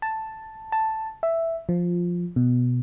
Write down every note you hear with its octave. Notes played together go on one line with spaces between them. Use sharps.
A5
A5
E5
F3
B2